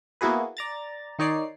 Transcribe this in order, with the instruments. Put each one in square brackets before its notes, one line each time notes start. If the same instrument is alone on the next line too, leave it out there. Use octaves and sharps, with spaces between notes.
[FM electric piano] A#3 B3 E4 F#4 G#4 B4
D5 A#5 A6
D#3 D#4 C#5 D5 C7